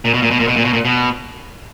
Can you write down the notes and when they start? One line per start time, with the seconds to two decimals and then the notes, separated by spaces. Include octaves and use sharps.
0.05 A#2
0.14 B2
0.22 A#2
0.31 B2
0.40 A#2
0.48 B2
0.57 A#2
0.65 B2
0.73 A#2
0.85 B2